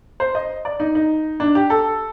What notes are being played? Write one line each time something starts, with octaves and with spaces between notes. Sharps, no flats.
C5
D#5
D5
D#4
D#4
D4
G4
A4